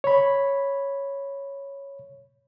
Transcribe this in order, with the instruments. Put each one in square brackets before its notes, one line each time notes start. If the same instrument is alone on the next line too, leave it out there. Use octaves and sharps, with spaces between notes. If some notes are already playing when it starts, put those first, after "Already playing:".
[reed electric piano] C#5 B5